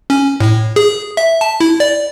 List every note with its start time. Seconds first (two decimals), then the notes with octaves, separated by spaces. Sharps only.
0.10 C#4
0.40 A2
0.76 G#4
1.17 E5
1.41 A5
1.60 E4
1.80 D5